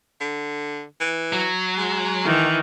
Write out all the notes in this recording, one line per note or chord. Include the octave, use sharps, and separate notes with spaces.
D3
E3
F#3
G#3
D#3 E3